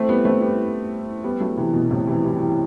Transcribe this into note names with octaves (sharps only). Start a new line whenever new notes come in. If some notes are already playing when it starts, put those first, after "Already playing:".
Already playing: A3 C4
G3 B3
A3 C4
G3 B3
G3 B3
F#3 A3
C3 E3
B2
A2 C3
C3 E3
E3 G3
E3 G3